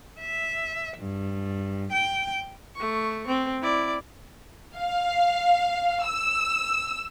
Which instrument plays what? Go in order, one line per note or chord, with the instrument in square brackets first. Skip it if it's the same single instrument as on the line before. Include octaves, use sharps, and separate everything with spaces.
[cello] E5
G2
G5
[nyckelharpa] A3 C#6
C4
E4 D5
[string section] F5
E6